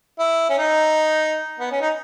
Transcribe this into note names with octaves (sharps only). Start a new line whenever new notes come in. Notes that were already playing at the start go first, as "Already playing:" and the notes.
E4
C#4
D#4
B3
C#4
D#4